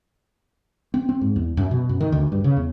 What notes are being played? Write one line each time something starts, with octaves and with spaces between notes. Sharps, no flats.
C4
C4
G#2
E2
F#2
B2
F#2
D#3
D2
G2
C#3
E2